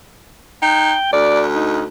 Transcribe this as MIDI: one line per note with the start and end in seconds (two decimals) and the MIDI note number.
0.62 0.94 63
0.62 1.09 79
1.13 1.84 38
1.13 1.42 74
1.55 1.84 63